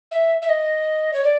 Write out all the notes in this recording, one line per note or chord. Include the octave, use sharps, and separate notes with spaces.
E5
E5
D#5
C#5
D5